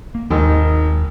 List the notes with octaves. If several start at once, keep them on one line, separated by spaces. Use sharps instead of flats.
A#3
G#1 D#2 D#3